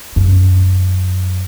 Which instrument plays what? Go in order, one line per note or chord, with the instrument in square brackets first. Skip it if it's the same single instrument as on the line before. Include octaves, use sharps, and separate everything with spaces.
[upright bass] F#2